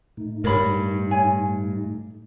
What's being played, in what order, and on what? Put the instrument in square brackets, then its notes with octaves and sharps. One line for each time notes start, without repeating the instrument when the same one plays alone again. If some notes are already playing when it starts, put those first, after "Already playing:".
[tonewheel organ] A2 A3 D#4
[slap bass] G2 [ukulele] A#4 C#5 B5
[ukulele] C#5 G#5